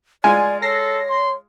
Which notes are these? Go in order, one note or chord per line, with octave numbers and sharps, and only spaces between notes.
G#3 F4 D5 G#5
A4 C#5 A#6 C7
C6